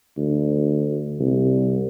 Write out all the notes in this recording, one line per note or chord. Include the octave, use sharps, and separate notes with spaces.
D2
C2